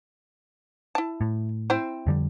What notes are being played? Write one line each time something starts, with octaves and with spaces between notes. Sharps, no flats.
E4 A5
A2
C4 E4 C5
F2 D3 G3